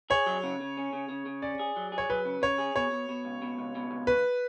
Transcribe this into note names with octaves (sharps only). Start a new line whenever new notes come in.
G#4 C#5
F#3
C#3
C#3
C#4
C#3
C#3
C#3
C#4 D5
G#4
F#3
G#4
C#5
F#3 B4
C#3
C#3 C#5
G#4
B2 C#5
B2
B2
C#2
B2
C#2
B2
C#2
C#2 B4